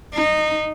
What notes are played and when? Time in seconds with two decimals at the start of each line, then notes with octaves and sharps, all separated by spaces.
0.14 D#4